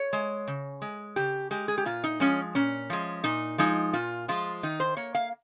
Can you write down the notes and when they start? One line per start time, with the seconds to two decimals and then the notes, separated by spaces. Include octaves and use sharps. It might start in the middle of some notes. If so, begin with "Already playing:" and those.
Already playing: C#5
0.13 G#3
0.47 C#3
0.82 G#3
1.16 C#3 G4
1.51 G#3 G4
1.68 G#4
1.78 G4
1.85 A#2 F4
2.04 D#4
2.20 F3 G#3 C#4
2.55 A#2 C#4
2.90 F3 G#3
3.24 A#2 D#4
3.58 F3 G#3 D#4
3.93 A#2 F4
4.28 F3 G#3 F4
4.63 D#3 D#4
4.80 C5
4.97 A#3 C#5
5.15 F5